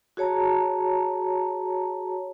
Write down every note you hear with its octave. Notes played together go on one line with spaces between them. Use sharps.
F#4 G#4 C#5 A5 A#5